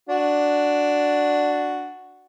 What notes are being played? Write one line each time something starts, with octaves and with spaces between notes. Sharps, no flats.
D4 F#4